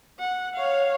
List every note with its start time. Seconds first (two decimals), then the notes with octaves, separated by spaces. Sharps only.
0.19 F#5
0.55 C#5 F5